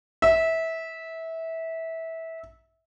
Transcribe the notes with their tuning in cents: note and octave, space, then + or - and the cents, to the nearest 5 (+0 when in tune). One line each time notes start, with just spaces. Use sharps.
E5 -20